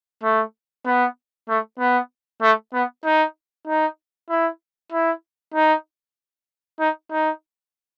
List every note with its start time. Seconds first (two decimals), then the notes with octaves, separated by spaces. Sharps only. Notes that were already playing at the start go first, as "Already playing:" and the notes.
0.23 A3
0.86 B3
1.49 A3
1.79 B3
2.42 A3
2.74 B3
3.05 D#4
3.67 D#4
4.29 E4
4.92 E4
5.55 D#4
6.80 D#4
7.11 D#4